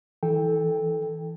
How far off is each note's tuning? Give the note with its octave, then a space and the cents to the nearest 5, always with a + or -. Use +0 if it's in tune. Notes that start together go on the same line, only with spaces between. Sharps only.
E3 -20 A4 -10 G5 +10